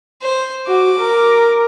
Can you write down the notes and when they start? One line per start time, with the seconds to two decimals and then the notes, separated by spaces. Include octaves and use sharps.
0.22 C5
0.68 F#4 D6
1.00 A#4